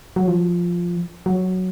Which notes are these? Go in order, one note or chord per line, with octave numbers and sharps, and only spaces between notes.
F#3
F3
F#3